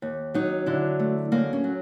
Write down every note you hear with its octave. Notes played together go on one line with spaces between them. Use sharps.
D#2
F#3 D#4
D3 E4
A3
F#2 A#3
C#4
F#3